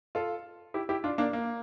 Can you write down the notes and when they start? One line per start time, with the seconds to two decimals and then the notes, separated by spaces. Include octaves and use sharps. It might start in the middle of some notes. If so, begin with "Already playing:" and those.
0.15 F4 A4
0.74 E4 G4
0.89 E4 G4
1.04 D4 F4
1.18 A#3 D4
1.33 A#3